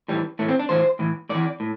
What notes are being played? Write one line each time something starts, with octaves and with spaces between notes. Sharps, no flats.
A2 E3 G3
A2 E3 A3
C4
D4
A2 E3 C5
A2 E3
A2 E3 D5
A2